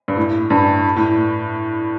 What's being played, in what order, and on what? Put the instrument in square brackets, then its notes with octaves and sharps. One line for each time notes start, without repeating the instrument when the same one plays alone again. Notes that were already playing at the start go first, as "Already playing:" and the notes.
[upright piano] G2
A2
G2
A2